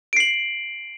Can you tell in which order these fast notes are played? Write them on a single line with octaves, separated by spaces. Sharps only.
D7 C7 F#7